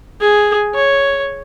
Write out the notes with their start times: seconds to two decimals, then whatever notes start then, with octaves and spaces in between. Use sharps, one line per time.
0.20 G#4
0.74 C#5